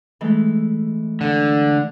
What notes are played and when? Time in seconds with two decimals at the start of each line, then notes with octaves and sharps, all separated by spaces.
0.21 E3 G#3 A3
1.21 D3